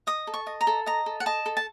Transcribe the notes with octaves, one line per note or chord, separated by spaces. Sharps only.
D#5 D#6
A4
C#6
D#5
A#5
A4
D#5 A#5
A4
F#5
D#5 A5
A4
A5